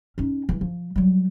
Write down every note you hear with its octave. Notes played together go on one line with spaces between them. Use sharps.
C#4 D#4
E3 E4
F3
F#3 G3